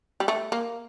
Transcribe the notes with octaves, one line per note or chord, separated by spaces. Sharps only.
G3
A3
A#3